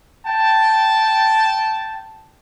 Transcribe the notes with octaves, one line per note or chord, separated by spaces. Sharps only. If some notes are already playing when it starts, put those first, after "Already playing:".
G5 A5